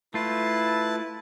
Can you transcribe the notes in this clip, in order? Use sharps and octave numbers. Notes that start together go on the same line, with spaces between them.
A3 E4 F4 B4 A5